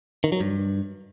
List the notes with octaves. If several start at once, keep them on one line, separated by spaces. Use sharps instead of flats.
D#3
F#3
G2